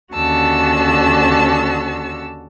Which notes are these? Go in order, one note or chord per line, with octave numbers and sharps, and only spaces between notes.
D#2 D3 C#4 F#4 A5 E6